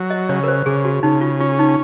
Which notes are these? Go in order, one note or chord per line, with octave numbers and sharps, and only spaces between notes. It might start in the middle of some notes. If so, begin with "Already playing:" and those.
Already playing: F#3
D#5
C#3 C#5
A#4
C5
C#3 G#4
F#4
C#3 D#4
F4
C#4 F4
D#4